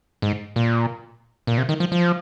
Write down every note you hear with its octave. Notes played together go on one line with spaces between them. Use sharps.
G#2
A#2
A#2
C3
D#3
F3
F3